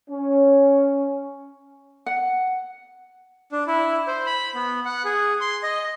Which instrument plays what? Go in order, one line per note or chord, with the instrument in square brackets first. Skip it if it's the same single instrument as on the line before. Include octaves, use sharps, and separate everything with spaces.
[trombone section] C#4
[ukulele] F#5
[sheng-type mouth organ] D4
E4
C5
B5
B3
F#5
G#4
C6
D#5